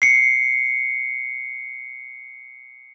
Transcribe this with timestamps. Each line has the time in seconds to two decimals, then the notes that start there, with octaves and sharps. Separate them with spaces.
0.02 C7 C#7